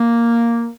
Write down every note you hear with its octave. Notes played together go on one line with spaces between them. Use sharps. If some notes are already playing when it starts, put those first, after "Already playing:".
Already playing: A#3